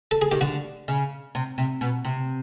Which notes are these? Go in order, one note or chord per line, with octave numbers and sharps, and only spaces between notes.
A4
G#4
D#3 G4
D3 F#4
C#3
C3
C3
B2
C3